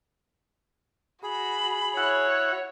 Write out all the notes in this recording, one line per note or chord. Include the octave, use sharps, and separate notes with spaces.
F#4 G#4 B5
E4 F#4 C#5 F#5